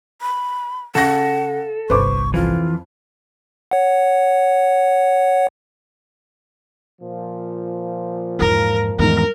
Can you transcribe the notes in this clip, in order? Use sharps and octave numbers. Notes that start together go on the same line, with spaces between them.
B5
C#3 A4 F#5 A#6
G1 C2 B4 C5 C#6 D6
F2 E3 F4
C#5 F#5
A#2 F3
E2 G#2 A#4
E2 G#2 D#3 G3 A#4